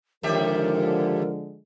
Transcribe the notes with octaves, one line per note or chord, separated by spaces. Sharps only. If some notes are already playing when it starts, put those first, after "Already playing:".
D#2 D3 F3 G#3 G4 A#4 E5